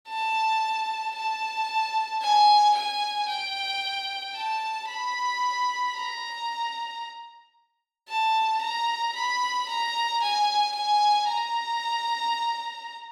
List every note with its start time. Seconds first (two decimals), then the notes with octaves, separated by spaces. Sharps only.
0.08 A5
1.15 A5
2.22 G#5
2.75 G#5
3.28 G5
4.35 A5
4.88 B5
5.95 A#5
8.08 A5
8.62 A#5
9.15 B5
9.68 A#5
10.21 G#5
10.75 G#5
11.28 A#5